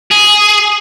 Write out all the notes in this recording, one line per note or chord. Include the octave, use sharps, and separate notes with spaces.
G#4